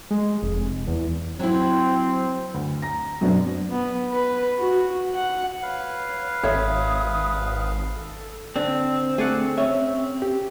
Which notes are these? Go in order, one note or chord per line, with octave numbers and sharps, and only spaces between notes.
G#3
F1
E2
F#3 C4 E4
D2
A#5 A#6
F#2 B2 F#3 C4 D4
B3
B4
F#4
F#5
B4 C#5 F5
G#1 C#5 E5 D#6
A4
D3 C4
A3 G#4 D5 F#5
C#4 E5
G4